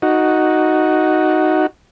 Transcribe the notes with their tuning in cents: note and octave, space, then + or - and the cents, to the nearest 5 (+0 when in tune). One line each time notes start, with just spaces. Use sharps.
D#4 +0 F#4 +0